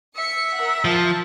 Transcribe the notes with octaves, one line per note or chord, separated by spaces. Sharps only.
E5 C#7
A#4 F#5
F3 A5